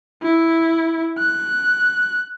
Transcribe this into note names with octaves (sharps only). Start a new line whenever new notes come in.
E4
F#6